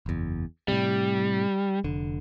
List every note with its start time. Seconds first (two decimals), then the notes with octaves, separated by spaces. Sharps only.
0.06 F#1 E2
0.68 A2 C3 G3
1.84 F1 D3